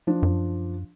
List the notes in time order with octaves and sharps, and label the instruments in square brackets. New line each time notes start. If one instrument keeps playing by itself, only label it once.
[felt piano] F3 D4
[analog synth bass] F#2